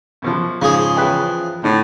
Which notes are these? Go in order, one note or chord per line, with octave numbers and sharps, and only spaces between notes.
F#2 B2 F3
G#2 C#3 F3 G#4
E2 B4 G5
A2 D3